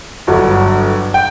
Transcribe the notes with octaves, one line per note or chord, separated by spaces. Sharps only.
G1 G2 F#3
G5